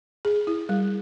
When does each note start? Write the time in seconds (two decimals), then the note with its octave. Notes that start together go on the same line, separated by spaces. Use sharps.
0.25 G#4
0.47 E4
0.69 G3